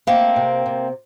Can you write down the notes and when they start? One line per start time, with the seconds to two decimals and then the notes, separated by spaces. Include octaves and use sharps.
0.07 A3 A#3 C4
0.36 C3
0.66 C3